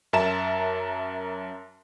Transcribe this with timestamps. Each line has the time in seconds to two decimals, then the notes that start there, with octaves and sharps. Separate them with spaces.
0.13 F#2 A#4 E5 A5 A#5 E7